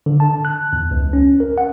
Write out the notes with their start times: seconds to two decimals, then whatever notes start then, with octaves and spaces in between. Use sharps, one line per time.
0.06 D3
0.20 A5
0.45 F#6
0.73 E2
0.91 C#2
1.13 C#4
1.40 A#4
1.58 F#5